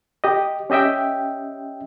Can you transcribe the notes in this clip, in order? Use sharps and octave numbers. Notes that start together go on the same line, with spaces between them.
G4 D#5
C#4 G4 D#5 E5 G5